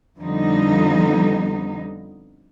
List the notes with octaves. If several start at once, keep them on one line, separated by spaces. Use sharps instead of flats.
F2 D3 F3 G3 B3 D#4